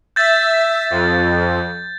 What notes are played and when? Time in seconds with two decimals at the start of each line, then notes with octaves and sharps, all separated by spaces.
0.16 E5 G6 A6
0.90 F2